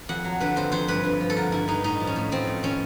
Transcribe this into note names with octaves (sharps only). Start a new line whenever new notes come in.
F2 F#5
F#3
D3 B4
F2 C5
F2 C5
G2 B4
G2
F3
A4
D3 A#4
G2 E4
G2 D#4
A2 D#4
F3
C#4
A2
F3 C4
A2
F3 C#4